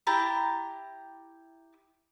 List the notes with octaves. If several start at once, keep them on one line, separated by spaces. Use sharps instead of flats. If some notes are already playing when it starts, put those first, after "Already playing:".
E4 G4 A5 A#5